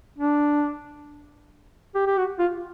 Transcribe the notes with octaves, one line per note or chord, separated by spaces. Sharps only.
D4
G4
G4
F#4
F4